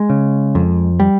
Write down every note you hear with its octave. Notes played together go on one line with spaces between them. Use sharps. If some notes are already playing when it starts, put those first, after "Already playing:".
Already playing: G#3
C#3
F2
G3